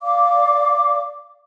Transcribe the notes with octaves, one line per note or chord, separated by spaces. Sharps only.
D5 F5 D6